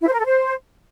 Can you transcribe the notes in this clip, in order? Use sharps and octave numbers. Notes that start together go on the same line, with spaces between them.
E4
C5
A#4
A4
C5